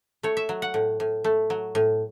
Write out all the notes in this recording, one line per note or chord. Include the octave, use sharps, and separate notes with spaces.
A3 C#5
E5
F#3
F#5
A2
A2
A3
F#3
A2